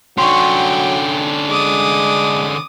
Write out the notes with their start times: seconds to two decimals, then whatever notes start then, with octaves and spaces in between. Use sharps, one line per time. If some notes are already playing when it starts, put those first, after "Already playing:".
0.18 D3 F#3 C#4 G5 C6 C#6
1.49 G#3 D6 D#6